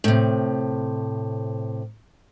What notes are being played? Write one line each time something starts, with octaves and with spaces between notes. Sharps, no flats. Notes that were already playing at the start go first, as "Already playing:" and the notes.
A2 C3